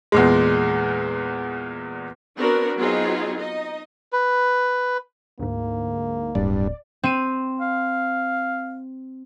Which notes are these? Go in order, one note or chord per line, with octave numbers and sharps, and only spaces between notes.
E2 A#2 G#3
B3 C4 D4 F#4 A#4
F#3 B3 C4 D#4 F4 G#4
D#4 D#5
B4
D2 G#2 A#3
D1 G2 D5
C4 D#7
F5